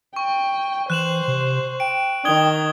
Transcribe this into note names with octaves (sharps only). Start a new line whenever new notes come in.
G5 C#6
E3 C5 F#6 E7 F#7
C3
G5 D7
D#3 D#6 G#6 G7